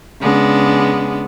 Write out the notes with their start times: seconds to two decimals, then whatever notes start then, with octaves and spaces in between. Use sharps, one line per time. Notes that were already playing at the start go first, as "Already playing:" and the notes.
0.21 C#3 G#3 B3 D4